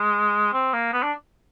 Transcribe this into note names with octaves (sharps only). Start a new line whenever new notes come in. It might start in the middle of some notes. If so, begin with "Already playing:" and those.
Already playing: G#3
C4
A#3
B3
D4